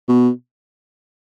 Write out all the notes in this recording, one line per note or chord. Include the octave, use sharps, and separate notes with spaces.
B2